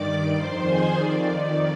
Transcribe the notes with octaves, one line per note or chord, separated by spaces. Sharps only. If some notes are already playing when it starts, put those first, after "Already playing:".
Already playing: G2 D#3 D5 D6
F2 D#3 C5 C6
G#4 G#5
F2 D#3 D5